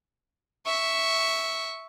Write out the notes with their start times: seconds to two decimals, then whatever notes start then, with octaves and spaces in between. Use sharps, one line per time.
0.66 E5 C#6